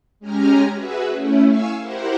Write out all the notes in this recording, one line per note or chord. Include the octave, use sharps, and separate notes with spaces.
G#3 C#4 G4 G#5 A#5 F6
F#4 G#4 B4 E5
A3 C#4 E4
F5 G#5 C#6 E6
E4 G4 A#4 C5 F#5